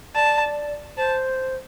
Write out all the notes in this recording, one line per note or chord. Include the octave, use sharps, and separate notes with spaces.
D5 A5
C5 A5